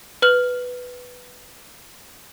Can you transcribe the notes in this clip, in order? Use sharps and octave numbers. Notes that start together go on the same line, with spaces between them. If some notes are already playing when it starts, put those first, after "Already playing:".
B4 F6 F#7